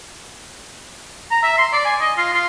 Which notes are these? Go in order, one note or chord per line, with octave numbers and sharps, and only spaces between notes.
A#5
E5
C6
D5
G#5
D#5
F4
F4